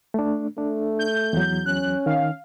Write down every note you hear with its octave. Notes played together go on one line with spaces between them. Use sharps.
A3 D4
A3 D4
G6
E2 F#3
C#4 F#6
D#3 F5